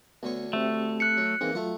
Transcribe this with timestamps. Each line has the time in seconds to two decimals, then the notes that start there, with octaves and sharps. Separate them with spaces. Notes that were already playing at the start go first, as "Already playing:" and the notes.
0.23 D2 D3 B3 C#5
0.53 A3 C4 G4 E5
1.00 F#6 C#7
1.17 F#3
1.41 E3 A#3 C4 D#4 G#4
1.55 F#3 A3 F4 F#5